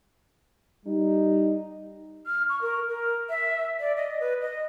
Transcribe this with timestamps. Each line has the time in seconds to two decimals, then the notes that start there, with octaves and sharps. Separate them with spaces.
0.86 G3 D#4
2.27 F6
2.49 C#6
2.62 A#4
2.89 A#4
3.29 E5
3.80 D5
3.96 D#5
4.20 B4
4.42 D#5